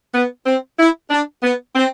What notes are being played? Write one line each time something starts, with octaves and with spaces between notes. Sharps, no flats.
B3
C4
E4
D4
B3
C4